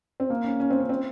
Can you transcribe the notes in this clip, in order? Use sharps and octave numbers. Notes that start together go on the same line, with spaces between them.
C4
A#3
C#4
C#4
C4
C#4
C4